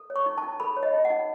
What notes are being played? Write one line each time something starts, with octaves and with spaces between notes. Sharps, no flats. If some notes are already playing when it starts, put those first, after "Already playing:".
Already playing: A4
C#5
C#6
D#4
A5
D#4
A4 B5
C#5
D#5
D#4
F#5
D#4